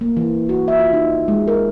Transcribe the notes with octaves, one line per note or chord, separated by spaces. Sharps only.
A#3
E3
F#4
E5
F4
D#4
G#3
A#4